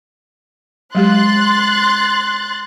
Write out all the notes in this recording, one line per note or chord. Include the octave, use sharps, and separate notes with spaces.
F#3 G#3 G4 C6 F#6 A6